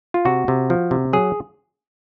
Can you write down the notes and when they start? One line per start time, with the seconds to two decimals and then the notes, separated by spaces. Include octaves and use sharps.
0.14 F4
0.25 C3 F#4
0.48 C3
0.70 F3
0.91 C3
1.13 F#3 G#4